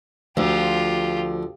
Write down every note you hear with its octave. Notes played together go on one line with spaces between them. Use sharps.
D2 F3 F4 G4